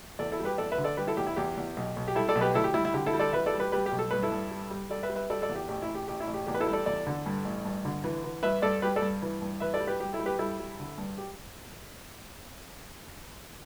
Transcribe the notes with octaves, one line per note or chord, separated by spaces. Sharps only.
E2 A4 D5
E4 A4
G3
G4 B4
E2 A4 D5
B4 E5
D3
A4 D5
G3 G4 B4
E4 A4
E2 G4
E4
E2 G4
E2
B1
B1
G4
G3 E4 A4
A4 D5
B1
G4 B4
D2 E4 A4
G4
G3 E4
E4
D3 G4
E4 A4
G3
A4 D5
E3 B4 E5
A4 D5
G3
G4 B4
G3 G4 B4
G4
B1
A4
G2 B4
E4 A4
G2
G3
G3
G3 A4 D5
B4 E5
G3
B4 E5
G3 A4 D5
A4 D5
E2
G4
A1 G4
E4
A1
G4
A1 G4
E4
A1
G4
E2 G4
B4
E4 A4
G3
A4 D5
E2 A4 D5
D3
G2
A1
G2
D3
E3
E3
G2 B4 E5
G2 A4 D5
G3 G4 B4
A4 D5
G2
E3
G2
E3 B4 E5
A4 D5
G3
G4 B4
G3 G4
E4 A4
G3
G4 B4
G3 E4 A4
G3
D3
G2
G4